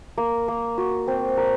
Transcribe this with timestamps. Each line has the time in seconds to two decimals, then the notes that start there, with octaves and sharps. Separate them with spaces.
0.18 A#3
0.48 A#3
0.78 F#4
1.07 C4
1.37 A#4